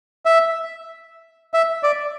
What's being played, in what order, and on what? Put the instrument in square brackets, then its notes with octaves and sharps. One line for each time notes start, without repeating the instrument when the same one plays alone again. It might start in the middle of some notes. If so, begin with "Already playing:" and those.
[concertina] E5
E5
D5